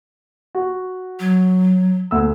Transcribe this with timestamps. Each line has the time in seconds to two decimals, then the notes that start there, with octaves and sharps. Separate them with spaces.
0.55 F#4
1.20 F#3
2.11 D2 E6